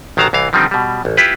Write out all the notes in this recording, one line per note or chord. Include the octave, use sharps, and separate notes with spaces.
A1 D#3 F#3 F5 A5 A#5
C2 E3 F5
D3 D#3 F3 G3 C4 D#4
B2 G3
A1
E4 F4 G4 B4